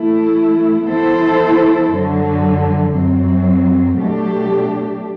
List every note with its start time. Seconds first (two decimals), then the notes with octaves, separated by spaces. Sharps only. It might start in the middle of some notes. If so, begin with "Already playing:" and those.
Already playing: E3 A3 E4
0.85 E3 B3 E4 A4 C5
1.89 F#2 D3 F#3
2.93 F#2 F#3 C4
3.96 B2 F#3 A3 D4 G4